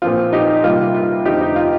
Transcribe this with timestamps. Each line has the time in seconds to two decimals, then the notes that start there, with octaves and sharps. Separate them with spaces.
0.02 A#2 F3 C4 F4
0.33 D#4 G4
0.64 C3 G3 A#3 F4
0.95 F4
1.25 F2 D3 A3 C4 D#4 G4
1.41 D#4
1.56 F4